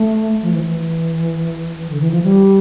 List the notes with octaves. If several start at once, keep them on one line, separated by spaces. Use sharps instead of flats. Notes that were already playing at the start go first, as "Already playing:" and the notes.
Already playing: A3
F3
E3
E3
D3
E3
F3
G3